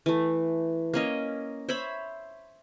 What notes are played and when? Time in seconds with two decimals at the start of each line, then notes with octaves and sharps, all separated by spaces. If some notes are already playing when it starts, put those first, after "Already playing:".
0.06 E3 A3
0.94 A#3 C#4 D#5
1.69 C5 C#5 E5 B5